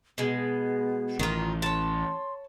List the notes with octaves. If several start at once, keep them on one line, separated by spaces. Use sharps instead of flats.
B2 G#3 B3
A1 D#3 F4
C#5 A5 C6